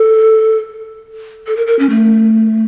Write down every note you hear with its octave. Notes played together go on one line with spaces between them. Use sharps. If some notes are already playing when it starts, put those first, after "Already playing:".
Already playing: A4
A4
A#4
A#4
C#4
A3